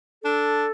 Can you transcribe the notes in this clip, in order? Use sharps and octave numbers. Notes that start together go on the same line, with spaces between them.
D4 A4